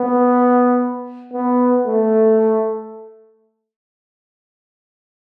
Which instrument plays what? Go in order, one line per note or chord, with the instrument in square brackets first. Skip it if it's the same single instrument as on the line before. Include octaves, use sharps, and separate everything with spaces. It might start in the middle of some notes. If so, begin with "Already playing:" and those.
Already playing: [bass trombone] B3
B3
A3